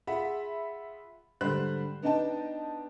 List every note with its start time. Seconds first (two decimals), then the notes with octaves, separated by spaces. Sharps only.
0.07 F4 G#4 E5 F#5 B5
1.41 G#2 D3 G3 C5 B5 F#6
2.03 B3 D4 D#4 D#5 G5 A5